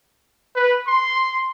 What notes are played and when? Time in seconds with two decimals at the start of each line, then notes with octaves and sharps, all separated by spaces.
0.55 B4
0.87 C6